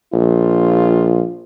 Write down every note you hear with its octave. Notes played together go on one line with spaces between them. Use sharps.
A#1 F4